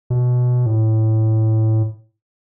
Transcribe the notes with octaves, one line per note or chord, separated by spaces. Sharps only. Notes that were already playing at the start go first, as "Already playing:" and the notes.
B2
A2